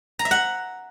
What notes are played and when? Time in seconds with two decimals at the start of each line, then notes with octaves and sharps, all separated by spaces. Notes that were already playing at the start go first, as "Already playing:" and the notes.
0.19 A#5
0.25 E5
0.31 F#5